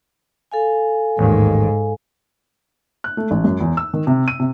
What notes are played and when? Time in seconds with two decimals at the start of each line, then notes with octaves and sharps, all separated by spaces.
0.52 A4 F5 G#5
1.19 A1 D#2 G#2 D#3
3.04 F#6
3.17 A3
3.31 A1
3.44 F#2
3.61 E2
3.77 E6
3.94 D#3
4.07 C3
4.28 D#7
4.40 C3